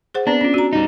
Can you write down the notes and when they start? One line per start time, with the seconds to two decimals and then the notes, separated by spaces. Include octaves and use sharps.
0.15 G#4 C5 F#5
0.27 B3 C4 D4 B4
0.41 C#4 F4
0.54 F#4 A#5
0.73 G3 D#4